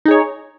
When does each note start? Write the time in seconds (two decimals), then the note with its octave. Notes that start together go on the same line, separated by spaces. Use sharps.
0.06 D#4
0.08 G#4
0.11 C#5